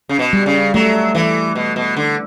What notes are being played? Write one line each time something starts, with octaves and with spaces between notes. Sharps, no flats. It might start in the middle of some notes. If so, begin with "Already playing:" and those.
C#3
B2
G3
C#3
F#3 A3
E3
B2
B2
D3